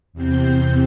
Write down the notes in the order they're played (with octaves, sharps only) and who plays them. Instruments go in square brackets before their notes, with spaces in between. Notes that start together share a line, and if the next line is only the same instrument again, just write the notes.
[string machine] E2 C3 C4 G6